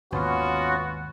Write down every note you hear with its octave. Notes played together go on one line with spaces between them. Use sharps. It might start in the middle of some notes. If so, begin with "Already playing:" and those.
G#1 D#2 B3 C#4 F4 F#4